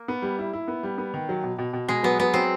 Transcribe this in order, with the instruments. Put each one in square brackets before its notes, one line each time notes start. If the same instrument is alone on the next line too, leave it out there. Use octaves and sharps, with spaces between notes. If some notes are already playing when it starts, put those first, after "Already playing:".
Already playing: [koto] A#3
[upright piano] B3
G3
E4
E4
B3
G3
B3
D#3
F#3
B2
B2
B2
[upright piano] B2 [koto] G#3
[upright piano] F#3 [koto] B3
[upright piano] F#3 [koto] B3
[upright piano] F#3 [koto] C4